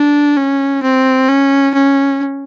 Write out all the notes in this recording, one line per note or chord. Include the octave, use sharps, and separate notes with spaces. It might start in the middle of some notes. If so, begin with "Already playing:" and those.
Already playing: D4
C#4
C4
C#4
C#4